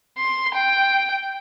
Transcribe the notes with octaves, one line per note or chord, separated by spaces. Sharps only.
C6
G5